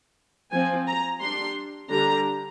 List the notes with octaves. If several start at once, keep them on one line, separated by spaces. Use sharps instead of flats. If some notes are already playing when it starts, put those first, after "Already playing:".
F3 C4 G#5
A#5
G3 D4 C6
D3 G3 D4 A#5